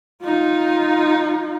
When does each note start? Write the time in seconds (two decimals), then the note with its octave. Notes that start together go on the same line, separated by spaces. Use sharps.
0.23 D#4 F4